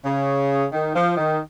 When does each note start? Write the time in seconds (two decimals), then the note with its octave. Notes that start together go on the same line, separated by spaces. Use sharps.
0.04 C#3
0.72 D#3
0.93 F3
1.17 D#3